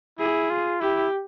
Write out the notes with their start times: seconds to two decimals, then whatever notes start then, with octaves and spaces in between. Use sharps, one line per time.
0.19 E4 G#4
0.50 F4
0.80 E4 G4